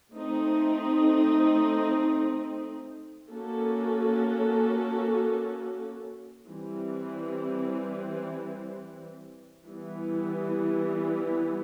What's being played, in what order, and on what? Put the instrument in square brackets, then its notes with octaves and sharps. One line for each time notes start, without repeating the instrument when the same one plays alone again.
[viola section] A3 C4 D#4
A#3 C#4 F#4 A4
E3 G3 C4
E3 G3 B3